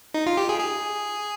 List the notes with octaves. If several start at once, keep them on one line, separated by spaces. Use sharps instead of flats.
D#4
F4
G4
G#4
G#4